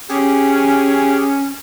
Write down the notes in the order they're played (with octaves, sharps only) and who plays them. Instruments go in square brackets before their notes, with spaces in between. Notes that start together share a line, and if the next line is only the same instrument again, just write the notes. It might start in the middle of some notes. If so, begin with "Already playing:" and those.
[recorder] C#4 [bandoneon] G4 G#4